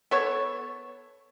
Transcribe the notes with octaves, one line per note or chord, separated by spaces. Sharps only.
B3 A4 C#5